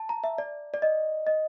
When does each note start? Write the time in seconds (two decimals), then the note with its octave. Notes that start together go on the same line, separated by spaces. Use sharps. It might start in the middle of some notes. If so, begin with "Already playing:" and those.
Already playing: A5
0.09 A#5
0.24 E5
0.38 D5
0.74 D5
0.82 D#5
1.27 D#5